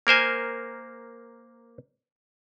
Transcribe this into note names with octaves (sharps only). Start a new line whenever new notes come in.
A#3 A#4 C5 G#5